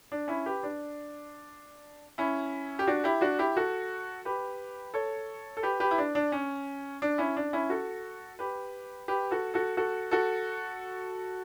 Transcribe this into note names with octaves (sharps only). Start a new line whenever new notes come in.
D4
C#4 E4
G4 B4
D4
C#4 E4
G4
D4 F#4
E4 G4
D4 F#4
E4 G4
F#4 A4
G4 B4
A4 C#5
A4
G4 B4
G4 B4
E4
D4
D4
C#4
D4
C#4 E4
D4
C#4 E4
F#4 A4
G4 B4
G4 B4
F#4 A4
F#4 A4
F#4 A4
F#4 A4